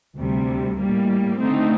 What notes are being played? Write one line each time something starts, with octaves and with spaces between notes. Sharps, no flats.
D2 C3 G3
A2 G3 A#3
D3 A3 C4 D#4